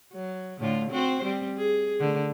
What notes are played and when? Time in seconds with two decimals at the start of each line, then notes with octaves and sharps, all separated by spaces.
0.13 F#3
0.59 A2 D3 F4
0.91 C4 F#4 C5
1.24 G3 C4
1.57 G#4
2.00 D3 A3